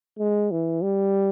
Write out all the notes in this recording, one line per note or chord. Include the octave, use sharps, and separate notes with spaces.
G#3
E3
G3